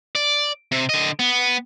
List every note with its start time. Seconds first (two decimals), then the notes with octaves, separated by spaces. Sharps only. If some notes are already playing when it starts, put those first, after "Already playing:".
0.15 D5
0.72 C3
0.89 D3 D#5
1.19 B3